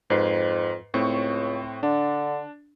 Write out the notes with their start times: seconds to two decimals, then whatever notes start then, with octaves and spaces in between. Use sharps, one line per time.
0.10 F2 G#2 B4 C7
0.94 C#2 A2 C4 C#6
1.83 D3 D4